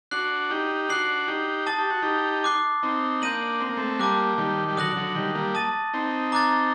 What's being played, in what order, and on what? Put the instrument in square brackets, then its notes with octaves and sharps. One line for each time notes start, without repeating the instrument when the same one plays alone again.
[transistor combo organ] D4 F#4 [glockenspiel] F#6 C7 F#7
[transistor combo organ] D#4 G4
[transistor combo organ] D4 F#4 [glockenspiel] F#6 C7 F#7
[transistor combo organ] D#4 G4
[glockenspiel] A5 D#6 A6
[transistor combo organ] G4
F#4
D#4 G4
[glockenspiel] D6 F#6 C7 G7
[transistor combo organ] C4 D#4
[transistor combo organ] A#3 D4 [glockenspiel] G6 A#6 D#7 F#7
[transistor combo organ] C4
A#3
A3 C4
[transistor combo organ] G3 A#3 [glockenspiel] A5 D6 F#6
[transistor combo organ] D#3 G3
G3
[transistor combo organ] D3 F#3 [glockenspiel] D#6 F#6 A#6 F#7
[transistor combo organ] D3 F#3
D#3 G3
G3 A#3
[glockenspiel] A5 D#6 A6 D#7
[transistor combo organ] C4 D#4
[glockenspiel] A#5 D6 F#6 A6